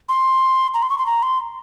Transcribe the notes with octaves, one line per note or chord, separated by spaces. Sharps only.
C6
A#5
C6
C#6
C6
A#5
C6